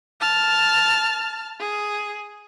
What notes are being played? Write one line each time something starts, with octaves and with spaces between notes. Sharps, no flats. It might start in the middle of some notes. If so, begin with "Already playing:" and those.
A5 F6
G#4